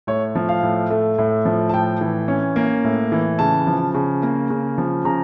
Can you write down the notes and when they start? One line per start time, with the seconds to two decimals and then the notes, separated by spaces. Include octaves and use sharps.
0.07 A2 C#5
0.35 F3
0.49 F5
0.63 A2
0.91 A3
1.18 A2
1.45 F3
1.69 A5
1.73 A2 G5
2.01 E3
2.28 C#4
2.56 A#3
2.84 A2
3.12 E3
3.39 C#3 A5
3.67 F3
3.94 C#3
4.23 A#3
4.50 C#3
4.78 F3
5.05 C#3 A#5